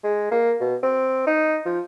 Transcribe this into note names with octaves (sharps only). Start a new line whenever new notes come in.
G#3
A#3
B2
C4
D#4
F3